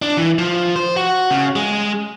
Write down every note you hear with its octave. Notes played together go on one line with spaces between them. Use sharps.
D4
E3
F3
C5
F#4
C#3
G#3